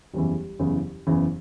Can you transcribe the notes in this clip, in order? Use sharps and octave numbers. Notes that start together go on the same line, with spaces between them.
F#1 E2 C#3 E3 G3
F#1 E2 C#3 E3
F#1 E2 C#3 E3